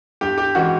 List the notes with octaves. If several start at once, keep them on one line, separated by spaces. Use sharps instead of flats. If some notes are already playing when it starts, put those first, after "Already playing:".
G2 G4
G4
E3 G#3 C#4 F#4